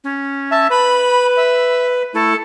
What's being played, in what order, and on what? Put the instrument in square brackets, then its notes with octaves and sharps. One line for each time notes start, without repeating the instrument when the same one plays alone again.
[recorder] C#4
[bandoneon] E5 A5
[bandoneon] B4 [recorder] B5
[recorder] E5
[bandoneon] A3 E4 [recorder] A4